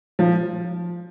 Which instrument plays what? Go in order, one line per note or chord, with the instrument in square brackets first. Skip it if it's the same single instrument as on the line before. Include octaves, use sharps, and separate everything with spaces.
[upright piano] F3